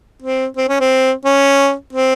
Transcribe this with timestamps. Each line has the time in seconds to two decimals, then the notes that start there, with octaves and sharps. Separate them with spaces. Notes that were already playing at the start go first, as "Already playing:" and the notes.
0.22 C4
0.57 C4
0.68 C#4
0.80 C4
1.25 C#4
1.93 C4